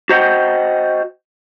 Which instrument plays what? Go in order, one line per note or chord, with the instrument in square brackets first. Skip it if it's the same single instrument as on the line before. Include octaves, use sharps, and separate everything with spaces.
[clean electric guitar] F#4 C5 D#5 F#5 G5